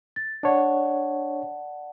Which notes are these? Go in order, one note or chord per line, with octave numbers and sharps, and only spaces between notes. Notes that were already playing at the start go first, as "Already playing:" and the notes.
A6
D4 C#5 D5 F#5 A5